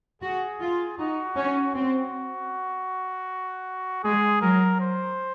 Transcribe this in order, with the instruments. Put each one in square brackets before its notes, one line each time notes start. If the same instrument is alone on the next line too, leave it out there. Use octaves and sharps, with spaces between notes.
[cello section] F#4 [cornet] G#4
[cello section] F4
[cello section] D#4 [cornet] F#4
[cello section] C#4
[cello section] C4 [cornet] F#4
[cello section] G#3 [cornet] G#4
[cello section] F#3 [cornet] A#4
[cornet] C5